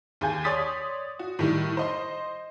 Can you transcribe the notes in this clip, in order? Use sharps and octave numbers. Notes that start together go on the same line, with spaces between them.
D#2 G#4 G#5 G6
C#5 D5 C6 D#6 A6 B6
F#4
A2 D#3 G3
C5 D#5 C6